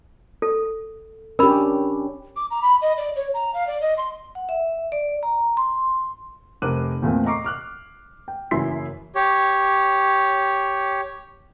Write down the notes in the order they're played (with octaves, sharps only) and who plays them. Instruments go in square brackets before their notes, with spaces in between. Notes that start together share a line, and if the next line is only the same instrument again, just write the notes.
[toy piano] A4
[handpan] C#4 D4 G4 [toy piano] A#4 B5
[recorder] D6
A#5
B5
D#5
D5
C#5
A#5
F5
D5
D#5
C6
[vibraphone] F#5
E5
D5
A#5
C6
[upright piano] F1 A#4 C5 D6 F#6 D#7
E2 A#2 A3 C4
D#5 A#5 C#6 D6 C7
D6 F6 F#6
G5
F#1 F#2 E3 E4 C6 B6
[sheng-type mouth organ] G4 C#5